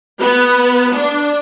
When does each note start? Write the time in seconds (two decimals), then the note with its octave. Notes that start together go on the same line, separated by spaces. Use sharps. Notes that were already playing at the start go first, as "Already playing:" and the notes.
0.20 B3
0.95 D4